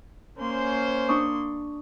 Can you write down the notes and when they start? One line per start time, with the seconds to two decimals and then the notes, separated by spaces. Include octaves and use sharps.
0.39 A#3 C#4 C5 C6
1.09 D4 C#6 D#6